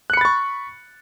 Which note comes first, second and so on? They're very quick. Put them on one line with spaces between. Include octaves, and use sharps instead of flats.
F#6 C#7 B5 A6 C#6